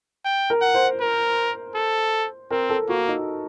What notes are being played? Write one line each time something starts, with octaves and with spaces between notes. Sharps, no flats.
G5
A#4
F#5
C5
A#4
A4
C4 A#4
A4
A#3 F#4
D#4